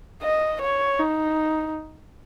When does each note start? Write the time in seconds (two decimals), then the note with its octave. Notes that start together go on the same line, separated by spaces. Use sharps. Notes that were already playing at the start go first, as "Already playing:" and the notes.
0.22 D#5
0.61 C#5
1.00 D#4